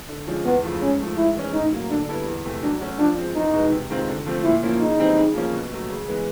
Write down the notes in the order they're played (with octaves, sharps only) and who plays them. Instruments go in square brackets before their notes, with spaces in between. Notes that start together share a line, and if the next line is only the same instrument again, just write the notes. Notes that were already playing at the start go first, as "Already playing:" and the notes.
[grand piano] D3
F3 G#3 C#4
[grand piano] E2 [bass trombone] B3
[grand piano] C#3 F3 A3
[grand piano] G#2 [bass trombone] C#4
[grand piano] F3 A3
[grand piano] G#2 [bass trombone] E4
[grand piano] E3 G#3 C#4
[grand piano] A2 [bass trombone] D#4
[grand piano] F#3 A#3
[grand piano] D3 [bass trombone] D4
[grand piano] G3 B3 E4 A4
E2
C3 E3 A3
[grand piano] F#3 [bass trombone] D4
[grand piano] A3 C#4 F#4
[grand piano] F3 [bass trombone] D4
[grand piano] G#3 C4
[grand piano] E2 [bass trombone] D#4
[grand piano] B2 G#3 B3
C3
D#3 G#3 C4 F4
D3
F3 A3 C4
[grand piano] A#2 [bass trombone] E4
[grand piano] F3 A#3 C#4 E4
[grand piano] C#3 [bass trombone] D#4
[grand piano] E3 G3 C4
C#3
F3 A#3 C#4
B2
F#3 A3
C#3
E3 G#3 B3